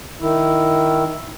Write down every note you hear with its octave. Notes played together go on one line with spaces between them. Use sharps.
D#3 E4